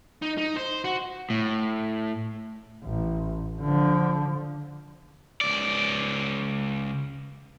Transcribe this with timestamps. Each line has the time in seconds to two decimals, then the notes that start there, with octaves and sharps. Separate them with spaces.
0.22 D#4
0.38 D#4
0.57 C5
0.84 F#4
1.30 A2
2.84 A1
3.61 D3 F3
5.41 C#2 D5